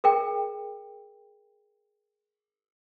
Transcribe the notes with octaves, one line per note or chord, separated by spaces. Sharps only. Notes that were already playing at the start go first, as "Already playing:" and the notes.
G#4 A#4 G5